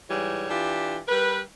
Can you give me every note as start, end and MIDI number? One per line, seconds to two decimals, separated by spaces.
0.09 0.49 44
0.09 0.49 52
0.09 0.49 55
0.09 0.49 73
0.49 0.98 52
0.49 0.98 62
0.49 0.98 65
0.49 0.98 67
1.08 1.39 55
1.08 1.39 70
1.08 1.39 71